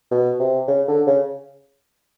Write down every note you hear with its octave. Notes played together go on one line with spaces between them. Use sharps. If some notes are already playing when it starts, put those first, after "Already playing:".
B2
C3
C#3
D3
C#3